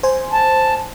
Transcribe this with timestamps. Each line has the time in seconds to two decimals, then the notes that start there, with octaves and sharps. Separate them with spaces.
0.03 C5 G#5
0.33 A5